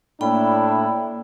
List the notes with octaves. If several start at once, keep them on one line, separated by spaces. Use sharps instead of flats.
A2 A#3 D4 E4 G5 B5